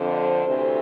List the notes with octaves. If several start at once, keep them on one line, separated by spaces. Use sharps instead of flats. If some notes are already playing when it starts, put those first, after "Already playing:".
Already playing: F2 D3 C5
D2 C3 E3